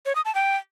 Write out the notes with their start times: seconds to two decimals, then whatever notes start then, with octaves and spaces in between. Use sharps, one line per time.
0.06 C#5
0.15 D#6
0.25 A5
0.35 G5